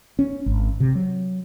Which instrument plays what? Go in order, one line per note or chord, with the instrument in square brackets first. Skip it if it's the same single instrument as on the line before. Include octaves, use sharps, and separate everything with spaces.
[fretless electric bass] C#4
G#1
C3
F#3